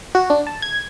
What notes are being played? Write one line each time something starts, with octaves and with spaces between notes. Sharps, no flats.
F#4
D4
A5
G#6